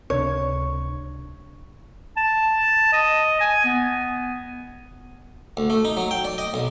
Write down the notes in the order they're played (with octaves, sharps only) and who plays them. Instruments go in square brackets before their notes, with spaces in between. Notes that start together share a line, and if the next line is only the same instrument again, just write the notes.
[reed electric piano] C#2 C3 D4 [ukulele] C#5
[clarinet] A5
D#5
G#5
B3
[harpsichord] D2
A3
D#4
F#3
G5
D5
D#5
B1